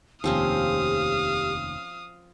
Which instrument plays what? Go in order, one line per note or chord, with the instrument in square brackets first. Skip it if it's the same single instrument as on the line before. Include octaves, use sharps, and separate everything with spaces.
[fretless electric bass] F1 D#2 [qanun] F3 C4 C#4 [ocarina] G4 [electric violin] F5 D#6